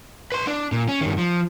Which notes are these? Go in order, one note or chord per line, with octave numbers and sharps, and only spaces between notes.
B4 C6
D4
A#2
C#4
G2 D#3
F3